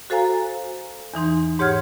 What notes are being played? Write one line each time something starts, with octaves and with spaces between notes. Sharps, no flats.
F#4 A4 C5 F5 G#5 A#5
E2 E3 D#4 C6
G#2 G4 C#5 F#5 F6 G#6